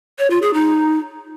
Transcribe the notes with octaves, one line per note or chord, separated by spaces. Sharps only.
C#5
F4
G#4
D#4